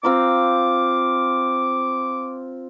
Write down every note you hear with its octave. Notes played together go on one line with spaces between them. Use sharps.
C4 F4 A#5 D6